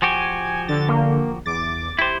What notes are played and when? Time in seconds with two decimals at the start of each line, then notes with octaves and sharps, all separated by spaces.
0.02 F3 F#4 G4 G#5
0.69 D3 A6
0.89 A#3
1.46 E2 D6 A6
1.99 E4 G4 C5